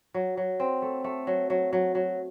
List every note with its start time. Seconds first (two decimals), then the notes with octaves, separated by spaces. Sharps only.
0.14 F#3
0.37 F#3
0.60 C4
0.82 A3
1.04 A3
1.27 F#3
1.50 F#3
1.73 F#3
1.95 F#3